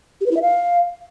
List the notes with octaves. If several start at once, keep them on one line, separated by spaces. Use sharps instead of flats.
G4
B4
E4
E5
F5